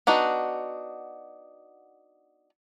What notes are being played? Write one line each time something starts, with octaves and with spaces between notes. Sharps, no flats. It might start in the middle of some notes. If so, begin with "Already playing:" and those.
B3 D4 D#4 F#4